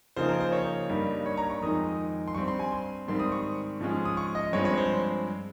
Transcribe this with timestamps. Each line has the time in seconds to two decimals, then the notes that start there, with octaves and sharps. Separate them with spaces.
0.16 C#3 F3 A#3 D#4 C5
0.29 A#4
0.40 C5
0.52 C#5
0.89 G2 G3 A#3 D#4
1.26 C#5
1.37 A#5
1.50 C#6
1.62 F2 D#3 G#3 D#4 D#6
2.28 C6
2.35 G2 G3 C4 C#6
2.48 C6
2.59 G#5
2.72 C6
3.08 G#2 D#3 G3 C4 C6
3.20 D#6
3.32 C#6
3.81 G#2 F3 G#3 C#4
4.05 D#6
4.17 C#6
4.35 D#5
4.53 G2 F3 G#3 C4 C#5
4.65 C#5
4.77 C5